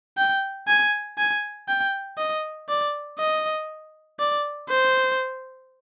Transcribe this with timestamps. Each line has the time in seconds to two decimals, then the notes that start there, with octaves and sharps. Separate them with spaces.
0.18 G5
0.68 G#5
1.18 G#5
1.68 G5
2.18 D#5
2.69 D5
3.19 D#5
4.20 D5
4.69 C5